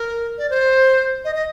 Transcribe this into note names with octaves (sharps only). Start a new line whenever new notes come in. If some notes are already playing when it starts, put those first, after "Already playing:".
Already playing: A#4
D5
C5
D#5
D#5